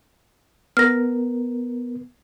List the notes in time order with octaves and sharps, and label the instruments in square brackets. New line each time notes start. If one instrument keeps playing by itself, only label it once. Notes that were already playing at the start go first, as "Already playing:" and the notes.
[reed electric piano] B3 A#4 [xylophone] F6 A#6